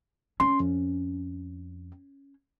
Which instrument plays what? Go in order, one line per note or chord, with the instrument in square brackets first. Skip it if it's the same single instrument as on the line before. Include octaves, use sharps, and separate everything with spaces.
[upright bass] C#4 [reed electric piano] C6
[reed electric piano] F2